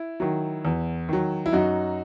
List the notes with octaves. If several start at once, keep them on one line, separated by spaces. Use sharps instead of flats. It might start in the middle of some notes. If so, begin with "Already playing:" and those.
Already playing: E4
D#3 F#3
E2
D#3 F#3
E4
F#2 D#4 F#4